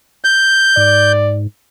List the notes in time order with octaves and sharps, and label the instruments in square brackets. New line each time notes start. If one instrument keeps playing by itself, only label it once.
[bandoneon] G6
[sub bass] G#2 [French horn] D5